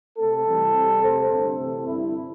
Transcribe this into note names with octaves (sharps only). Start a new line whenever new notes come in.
C3 A3 C4 A4
C3 E3 G3 C4
C3 G3 C4
C3 A3 C4 C5
G2 D3 A3 C4 A4
C3 E3 C4
G2 D3 C4 E4